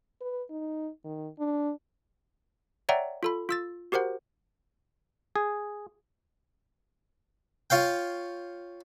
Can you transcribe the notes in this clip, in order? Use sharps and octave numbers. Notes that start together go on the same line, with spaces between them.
B4
D#4
D#3
D4
C#5 D5 E5 F#5 G5 A#5
F4 A4 B5
F4 E6 A6
F#4 G4 A#4 C5 F#5
G#4
F4 C#5 F5 G5